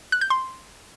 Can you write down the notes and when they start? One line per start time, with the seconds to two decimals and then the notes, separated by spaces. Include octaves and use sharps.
0.12 F#6
0.21 G6
0.30 C6